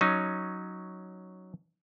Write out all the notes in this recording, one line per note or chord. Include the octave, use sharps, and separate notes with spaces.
F#3 C#4 D#4